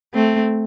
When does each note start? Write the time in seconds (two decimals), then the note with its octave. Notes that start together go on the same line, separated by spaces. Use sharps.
0.14 A3 C4